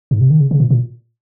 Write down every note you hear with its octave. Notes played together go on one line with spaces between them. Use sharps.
G#2
C3
D#3
C#3
C#3
A#2
A#2